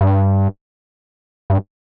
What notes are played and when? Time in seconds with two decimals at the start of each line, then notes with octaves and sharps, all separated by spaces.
0.01 G2
1.50 G2